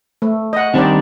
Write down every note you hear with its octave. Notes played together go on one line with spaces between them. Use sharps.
A3
D#5 F#5
D#3 G3 C4 D4 D#4 D5